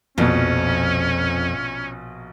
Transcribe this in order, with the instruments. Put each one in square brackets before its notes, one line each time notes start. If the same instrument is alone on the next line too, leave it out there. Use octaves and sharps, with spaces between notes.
[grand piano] A#1 B2 [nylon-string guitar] F2 [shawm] C#4